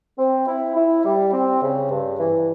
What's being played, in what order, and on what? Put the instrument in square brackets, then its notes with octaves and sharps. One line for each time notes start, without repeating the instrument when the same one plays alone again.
[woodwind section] C4
E4
E4
G3
C4
C#3
G2
E3